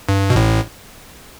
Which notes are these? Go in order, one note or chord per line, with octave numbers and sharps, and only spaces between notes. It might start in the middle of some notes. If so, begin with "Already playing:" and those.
G2
B2
A1 A2